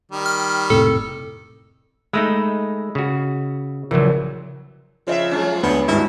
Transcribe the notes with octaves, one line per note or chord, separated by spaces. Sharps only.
D#3 G3
F6
F1 A2 C3 A4
G#3 A3 D#4 D#5 B5 E6
C#3 F#4
A#1 C#3 E3 F#3
C#3 F3 D#5 E5
F#3 G#3 C#4
D2 B3
G#1 G2 E4